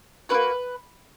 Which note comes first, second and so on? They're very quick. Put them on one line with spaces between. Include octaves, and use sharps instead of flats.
C#4 F#4 B4 A#3